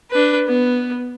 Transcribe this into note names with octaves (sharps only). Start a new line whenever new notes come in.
D4 B4
B3